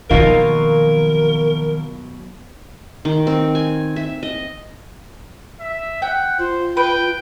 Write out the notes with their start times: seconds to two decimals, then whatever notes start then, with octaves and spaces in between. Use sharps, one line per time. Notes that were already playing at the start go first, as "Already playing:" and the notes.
0.10 B2 D#3 F3 F#3 A#3 D#4 F4 A#4
3.05 D#3
3.27 C4
3.55 G#5
3.96 E5
4.23 D#5
5.60 E5
6.02 F#5 G5
6.39 F4 C5
6.77 B4 G5